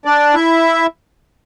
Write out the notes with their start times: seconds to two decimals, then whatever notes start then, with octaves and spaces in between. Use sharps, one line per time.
0.05 D4 D5
0.34 E4 E5